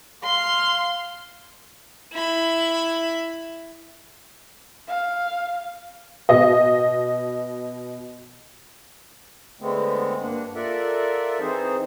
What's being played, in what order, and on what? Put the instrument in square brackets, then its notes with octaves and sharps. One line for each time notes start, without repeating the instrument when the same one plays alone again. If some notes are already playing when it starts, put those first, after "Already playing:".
[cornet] F5 [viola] C6
[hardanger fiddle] E4 B5
[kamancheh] F5
[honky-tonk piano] B2 D#5
[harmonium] D3 G#3 A3 B3 C4
G2 A#3 D4 F#5
F4 A4 A#4 D5 E5 F#5
E3 C4 D#4 G#4 C5